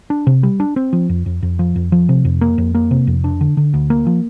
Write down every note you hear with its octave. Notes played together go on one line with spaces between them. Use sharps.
D4
C3
G3
D4
C4
F3
F2
F2
F2
F3
F2
F3
C3
F2
A#3
F2
A#3
C3
F2
D4
D3
D3
D2
A#3
F3